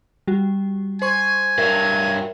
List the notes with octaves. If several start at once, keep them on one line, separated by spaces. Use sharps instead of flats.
G3 F#4
C5 G#5 C6 C#6
G2 F#3 A#4 E5